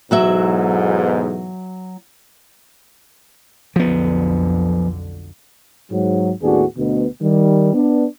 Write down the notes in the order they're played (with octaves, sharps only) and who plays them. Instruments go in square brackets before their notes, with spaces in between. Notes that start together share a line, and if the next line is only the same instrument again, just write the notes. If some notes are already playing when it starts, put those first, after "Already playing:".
[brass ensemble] B1 E2 G#2 [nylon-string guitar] F#3 F#4 E5
[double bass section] B1 F2 D3 [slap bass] F3 B3
[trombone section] G#2 F#3
D#2 A2 B3 D4 F#4 G#4
D2 B2
D#3 G3
B3 D4